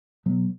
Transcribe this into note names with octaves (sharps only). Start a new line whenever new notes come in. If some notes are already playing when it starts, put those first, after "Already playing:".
B2 F#3 B3